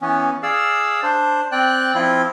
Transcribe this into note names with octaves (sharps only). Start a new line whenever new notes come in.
E3 B3 C#4
G#4 D5 F5 E6
D4 C5
C4 D5 G5 F#6
F3 C4 E4 F4